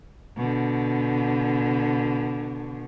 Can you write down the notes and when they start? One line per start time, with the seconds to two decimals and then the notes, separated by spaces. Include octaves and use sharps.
0.37 B2 D3